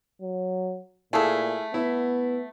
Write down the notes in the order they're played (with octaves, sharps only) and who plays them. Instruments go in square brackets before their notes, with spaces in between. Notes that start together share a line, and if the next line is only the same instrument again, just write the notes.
[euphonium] F#3
[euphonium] A#2 [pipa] A3 A4 [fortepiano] E4 G#4 F5
[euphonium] B3 [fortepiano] E4